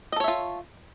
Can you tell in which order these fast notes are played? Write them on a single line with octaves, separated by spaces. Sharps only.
D#5 A4 C#5 E5 F4